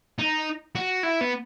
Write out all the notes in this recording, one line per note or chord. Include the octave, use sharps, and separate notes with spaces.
D#4
F#4
E4
B3